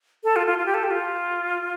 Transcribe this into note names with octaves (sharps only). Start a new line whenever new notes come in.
A4
F4
F4
F4
G4
A4
G4
F4